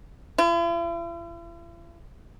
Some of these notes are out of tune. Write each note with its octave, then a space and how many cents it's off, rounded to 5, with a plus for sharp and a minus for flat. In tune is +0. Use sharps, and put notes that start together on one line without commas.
E4 +45